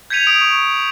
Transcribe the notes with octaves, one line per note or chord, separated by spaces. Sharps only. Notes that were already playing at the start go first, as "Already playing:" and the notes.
G6 G#6 B6 C#7 D#7 F7
D#6 D7
C#6